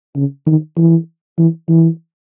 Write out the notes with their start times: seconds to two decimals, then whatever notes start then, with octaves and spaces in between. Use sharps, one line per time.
0.16 C#3
0.46 D#3
0.77 E3
1.38 E3
1.69 E3